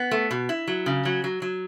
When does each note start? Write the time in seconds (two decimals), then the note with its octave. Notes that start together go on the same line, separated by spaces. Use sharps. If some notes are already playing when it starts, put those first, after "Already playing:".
Already playing: B3
0.11 A3
0.31 B2
0.49 E4
0.68 F#3
0.86 C#3
1.05 F#3
1.24 F#3
1.42 F#3